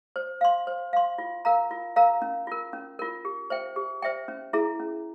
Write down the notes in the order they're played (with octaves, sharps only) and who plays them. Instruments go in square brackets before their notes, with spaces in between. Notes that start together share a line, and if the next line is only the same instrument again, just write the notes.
[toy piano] C5
F5 C6
C5
F5 C6
F4
A#4 F5 A#5
F4
A#4 F5 A#5
C#4
F4 A#4
C#4
F4 A#4
G4
C5 E5 G5
G4
C5 E5 G5
C#4
E4 G#4 E5 A#5
C#4